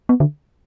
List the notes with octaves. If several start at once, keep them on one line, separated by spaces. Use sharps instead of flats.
B3
D3